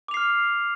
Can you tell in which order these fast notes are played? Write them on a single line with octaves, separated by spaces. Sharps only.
D6 F7 C7 F6